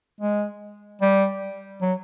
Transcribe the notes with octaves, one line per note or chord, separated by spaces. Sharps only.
G#3
G3
F#3